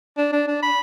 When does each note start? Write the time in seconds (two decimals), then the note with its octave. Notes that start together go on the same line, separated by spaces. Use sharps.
0.17 D4
0.32 D4
0.47 D4
0.62 B5